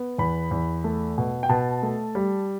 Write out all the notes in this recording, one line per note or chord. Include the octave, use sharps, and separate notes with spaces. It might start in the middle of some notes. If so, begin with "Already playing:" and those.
Already playing: B3
E2 B5
E2
A3
B2
G5
B2 A5
A3
G3